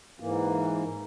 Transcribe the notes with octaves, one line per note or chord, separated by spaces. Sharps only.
G#2 E3 A#3